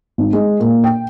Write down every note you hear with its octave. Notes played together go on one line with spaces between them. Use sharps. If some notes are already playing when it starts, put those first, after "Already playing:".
G#1
G#3
A#2
G5